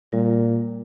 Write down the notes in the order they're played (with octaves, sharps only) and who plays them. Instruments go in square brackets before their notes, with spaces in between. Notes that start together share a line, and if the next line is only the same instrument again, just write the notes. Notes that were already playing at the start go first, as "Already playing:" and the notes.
[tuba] A#2 [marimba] G3